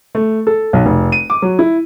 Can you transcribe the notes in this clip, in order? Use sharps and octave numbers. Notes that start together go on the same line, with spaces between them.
A3
A4
B1
F1
D#7
D6
F#3
E4